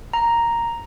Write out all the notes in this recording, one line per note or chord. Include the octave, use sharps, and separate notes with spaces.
A#5